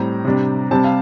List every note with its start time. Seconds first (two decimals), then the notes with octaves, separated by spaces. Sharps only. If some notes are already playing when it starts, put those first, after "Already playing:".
Already playing: A2 G3 C4 A#5
0.25 C3 G3 D4
0.71 C3 G3 C4 A5
0.84 F5